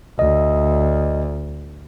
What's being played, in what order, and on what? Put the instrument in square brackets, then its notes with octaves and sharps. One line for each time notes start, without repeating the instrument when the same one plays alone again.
[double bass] D2 [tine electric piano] D#5